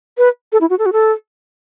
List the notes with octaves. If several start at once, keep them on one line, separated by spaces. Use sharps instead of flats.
B4
A4
E4
F#4
A4
F#4
A4